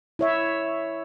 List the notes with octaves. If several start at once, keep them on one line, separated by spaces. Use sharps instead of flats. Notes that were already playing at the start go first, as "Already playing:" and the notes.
E4 C#5 E5